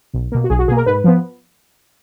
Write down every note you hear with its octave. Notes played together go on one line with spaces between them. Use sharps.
B1
B2 A#3
F#4
B1 G#4
F#4
B2 A#3 G#4
A#4
G#2 B4
F3 B3